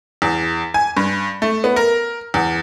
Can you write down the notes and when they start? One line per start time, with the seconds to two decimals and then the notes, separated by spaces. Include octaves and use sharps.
0.22 E2
0.74 G#5
0.97 G2
1.42 A3
1.64 B3
1.76 A#4
2.34 E2